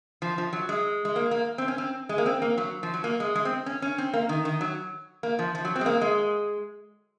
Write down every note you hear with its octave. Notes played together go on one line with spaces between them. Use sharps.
F3
F3
F#3
G#3
G#3
A#3
A#3
C4
C#4
C4
G#3
A#3
C4
A#3
F#3
F3
F#3
A#3
G#3
G#3
C4
C#4
C#4
C4
A#3
D#3
D#3
F#3
A#3
F3
F3
F#3
C4
G#3
A#3
G#3